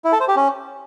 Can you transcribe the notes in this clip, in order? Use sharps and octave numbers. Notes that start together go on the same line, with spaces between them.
E4
A4
C5
G4
C#4